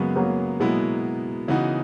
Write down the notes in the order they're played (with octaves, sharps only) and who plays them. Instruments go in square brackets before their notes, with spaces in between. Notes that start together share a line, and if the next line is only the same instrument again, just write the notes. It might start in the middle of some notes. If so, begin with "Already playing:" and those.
Already playing: [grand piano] F#2 C#3 G#3 B3 F#4 [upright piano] F#3 A#3
[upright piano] F#3 A#3
[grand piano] B2 G#3 B3 E4 [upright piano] F#3 A#3
[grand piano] C#3 E3 B3 D#4 F#4